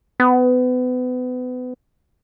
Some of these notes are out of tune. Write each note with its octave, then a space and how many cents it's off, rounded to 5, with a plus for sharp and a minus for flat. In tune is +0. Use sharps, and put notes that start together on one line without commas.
B3 +30